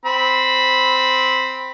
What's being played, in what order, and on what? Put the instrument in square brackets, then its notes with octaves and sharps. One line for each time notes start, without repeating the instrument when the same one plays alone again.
[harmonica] C4 B5